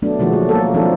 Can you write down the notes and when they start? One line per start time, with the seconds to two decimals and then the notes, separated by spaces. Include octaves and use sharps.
0.02 F#3 A3 B3 D4
0.19 B2 D#3 F3 G#3 A#3 F#4
0.33 D#3 F#3 A#3
0.49 A3 A#3 A4
0.74 D#3 F3 C4 D4 D#4 A4